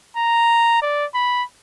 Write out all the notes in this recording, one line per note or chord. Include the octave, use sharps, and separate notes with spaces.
A#5
D5
B5